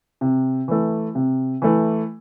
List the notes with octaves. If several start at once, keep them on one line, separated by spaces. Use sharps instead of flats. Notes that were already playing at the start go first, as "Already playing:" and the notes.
C3
E3 A3
C3
E3 A3